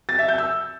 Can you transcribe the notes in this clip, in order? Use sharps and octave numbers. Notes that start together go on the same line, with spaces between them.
A6
E5
G6
E6